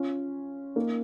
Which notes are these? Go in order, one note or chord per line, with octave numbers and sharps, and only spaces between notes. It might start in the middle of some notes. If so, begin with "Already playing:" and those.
Already playing: C#4 F4
A#3 D#4